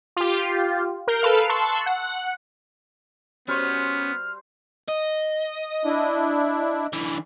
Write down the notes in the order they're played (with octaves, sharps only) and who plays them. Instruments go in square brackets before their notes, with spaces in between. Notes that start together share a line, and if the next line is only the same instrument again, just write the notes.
[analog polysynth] F4 G4
A#4 G6 C7 D7
A4 B4 F5 F6
A5 C6 C#6 E6 F#6
F#5
[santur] G3 F#4 C5 [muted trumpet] B3 [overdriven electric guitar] C#4 [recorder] F6
[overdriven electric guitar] D#5
[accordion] D4 E4
[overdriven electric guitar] D3 E3